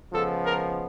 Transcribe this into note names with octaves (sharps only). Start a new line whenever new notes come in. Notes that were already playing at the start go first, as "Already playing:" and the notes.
C#3 F3 G#3 B3 A4
A#4